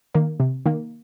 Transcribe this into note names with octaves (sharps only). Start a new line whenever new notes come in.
D#3 A#3
C3
D#3 A#3